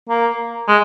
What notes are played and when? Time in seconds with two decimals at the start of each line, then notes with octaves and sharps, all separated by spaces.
0.09 A#3
0.68 G#3